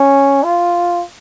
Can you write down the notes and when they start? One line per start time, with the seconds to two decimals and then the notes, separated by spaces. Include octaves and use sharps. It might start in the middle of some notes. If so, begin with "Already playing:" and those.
Already playing: C#4
0.43 F4